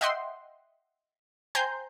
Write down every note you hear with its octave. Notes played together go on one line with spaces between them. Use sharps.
D#5 E5 F#5 G5 C6
C5 G5 G#5 A#5 C6 G6